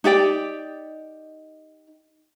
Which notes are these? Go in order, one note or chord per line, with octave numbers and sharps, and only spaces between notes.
D#4 G4 D5 G5